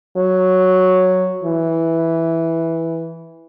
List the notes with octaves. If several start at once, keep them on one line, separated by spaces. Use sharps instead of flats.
F#3
E3